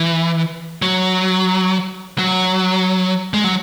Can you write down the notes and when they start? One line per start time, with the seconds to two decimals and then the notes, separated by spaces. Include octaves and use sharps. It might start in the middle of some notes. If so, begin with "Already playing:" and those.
Already playing: E3
0.82 F#3
2.18 F#3
3.34 G#3
3.44 F#3